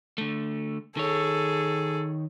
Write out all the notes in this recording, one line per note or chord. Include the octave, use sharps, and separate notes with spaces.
D3 A3
D#3 G#4 A4 C#5